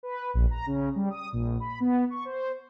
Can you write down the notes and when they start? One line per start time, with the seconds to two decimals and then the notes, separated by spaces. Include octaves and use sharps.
0.03 B4
0.34 A#1
0.51 A#5
0.67 C#3
0.96 G3
1.10 D#6
1.33 A#1
1.60 B5
1.80 B3
2.10 C#6
2.25 C5